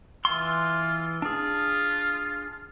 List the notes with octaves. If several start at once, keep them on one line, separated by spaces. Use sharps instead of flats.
E3 F4 C6
D4 F4 G#4